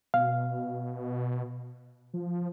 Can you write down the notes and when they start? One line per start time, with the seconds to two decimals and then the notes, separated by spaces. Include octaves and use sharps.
0.14 B2 F5
2.14 F3